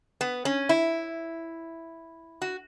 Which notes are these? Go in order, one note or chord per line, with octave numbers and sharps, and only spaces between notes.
B3
C#4
E4
F#4